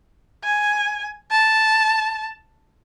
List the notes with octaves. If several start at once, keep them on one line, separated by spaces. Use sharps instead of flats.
G#5
A5